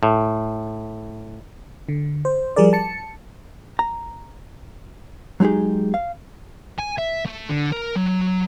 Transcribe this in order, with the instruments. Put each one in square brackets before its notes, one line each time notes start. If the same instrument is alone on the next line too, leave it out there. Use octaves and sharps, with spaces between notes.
[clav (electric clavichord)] A2
[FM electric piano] D3
C5
F3 G3 G#4 A#4 D5
A5 C#7
[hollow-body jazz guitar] A#5
F#3 G#3 D#4 G4 G#4
F5
[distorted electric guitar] G#5
E5
A3
D3
A#4
F#3